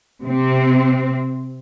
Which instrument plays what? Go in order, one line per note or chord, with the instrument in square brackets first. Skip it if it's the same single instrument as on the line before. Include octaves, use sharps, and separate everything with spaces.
[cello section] C3 C4